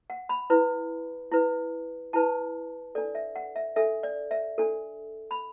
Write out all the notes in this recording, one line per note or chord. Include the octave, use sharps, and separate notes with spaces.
F#5
B5
E4 B4
E4 B4
E4 B4 A5
D4 A4 D5
E5
F#5
E5
D4 A4 E5
D5
E5
D4 A4
B5